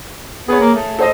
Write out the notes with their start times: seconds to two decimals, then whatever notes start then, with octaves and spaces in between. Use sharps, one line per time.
0.48 B3 G#4 C#5
0.61 A#3
0.75 A3
0.99 A4 C5 D#5